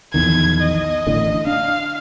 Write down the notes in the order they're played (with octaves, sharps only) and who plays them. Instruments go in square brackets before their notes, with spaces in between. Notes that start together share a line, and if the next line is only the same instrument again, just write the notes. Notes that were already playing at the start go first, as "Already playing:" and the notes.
[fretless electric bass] A#1 E2 D#3 [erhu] G#6
[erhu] D#5
[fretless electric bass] A1 A2 D3
[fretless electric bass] D4 [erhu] F5